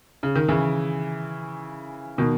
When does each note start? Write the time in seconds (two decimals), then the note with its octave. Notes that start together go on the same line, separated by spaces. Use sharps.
0.23 C#3
0.36 D#3
0.48 C#3 E3
2.18 B2 D#3